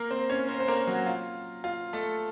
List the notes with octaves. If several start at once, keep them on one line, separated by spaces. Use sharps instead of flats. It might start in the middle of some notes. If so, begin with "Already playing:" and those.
Already playing: A#3 A#4
C4 C5
C#4 C#5
C4 C5
C5
A#3 A#4
F#3 F#4
F4
F4
A3 A4